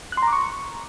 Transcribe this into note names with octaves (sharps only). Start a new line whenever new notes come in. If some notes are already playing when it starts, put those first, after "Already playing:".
F#6
C6
A#5
D6
C#6